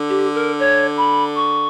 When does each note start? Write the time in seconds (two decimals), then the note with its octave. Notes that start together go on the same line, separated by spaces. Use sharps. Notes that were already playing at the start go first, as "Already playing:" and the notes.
Already playing: D3
0.09 G4
0.34 A#4
0.59 C#5
0.97 B5
1.35 C#6